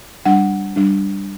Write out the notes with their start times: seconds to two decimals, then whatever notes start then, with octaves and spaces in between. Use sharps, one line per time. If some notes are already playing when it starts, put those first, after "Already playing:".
0.25 G3 D4 F#5
0.76 G3 D4